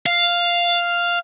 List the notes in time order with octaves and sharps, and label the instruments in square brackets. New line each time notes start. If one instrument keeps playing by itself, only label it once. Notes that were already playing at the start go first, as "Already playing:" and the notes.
[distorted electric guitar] F5